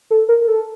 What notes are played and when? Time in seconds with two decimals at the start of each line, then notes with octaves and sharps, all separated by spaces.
0.10 A4
0.29 A#4
0.47 A4